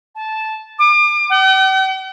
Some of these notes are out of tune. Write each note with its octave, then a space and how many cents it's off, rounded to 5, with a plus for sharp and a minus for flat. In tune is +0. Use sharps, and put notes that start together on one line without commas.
A5 -10
D6 +40
G5 -45